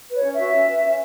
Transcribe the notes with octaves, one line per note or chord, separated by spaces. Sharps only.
B4 C#5
C#4
E5
F#4
C#4
B4
C#4